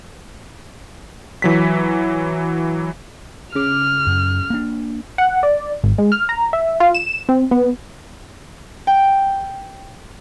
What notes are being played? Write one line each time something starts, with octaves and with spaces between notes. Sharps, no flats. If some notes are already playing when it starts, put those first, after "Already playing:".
E3 F#3 B6
C#3 D6 F6
F#2
A#3 D4
F#5
D5
G#1
G#3
F6
A#5
E5
F4
E7
C4
B3
G5